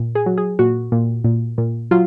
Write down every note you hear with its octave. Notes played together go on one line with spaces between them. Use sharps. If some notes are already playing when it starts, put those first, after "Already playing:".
Already playing: A#2
G#4
F#3
G#4
A#2 F#4
A#2
A#2
A#2
F#3 F4